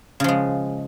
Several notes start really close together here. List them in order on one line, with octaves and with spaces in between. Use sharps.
C#3 F3 G#3